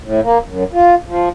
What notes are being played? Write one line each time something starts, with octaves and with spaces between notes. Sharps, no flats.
A2
A#3
F#2
F4
F3